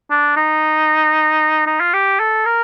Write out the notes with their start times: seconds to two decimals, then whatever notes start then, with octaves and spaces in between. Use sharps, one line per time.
0.11 D4
0.37 D#4
1.66 D#4
1.80 F4
1.94 G4
2.20 A4
2.46 A#4